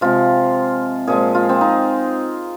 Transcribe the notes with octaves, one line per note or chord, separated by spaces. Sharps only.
C3 F3 G#3 F4
A#2 F3 G#3 G#4
F4
C4
D#4